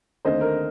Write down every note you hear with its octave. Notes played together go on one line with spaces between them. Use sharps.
D#2 D3 A3 C4 C5 D#5
A#4